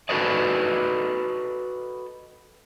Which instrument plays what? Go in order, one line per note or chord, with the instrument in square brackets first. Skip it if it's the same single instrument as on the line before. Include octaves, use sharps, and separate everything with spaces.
[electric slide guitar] F#4 A4 B4 D5 D#5